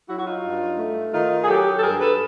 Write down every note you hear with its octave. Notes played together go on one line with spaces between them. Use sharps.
F#3 E4 F#4
F#4
D#4 F4
G2
A3
D#3 D#4 F4
G#4
F#3 G4 A4
A4
G2 G#4 A#4
A4 B4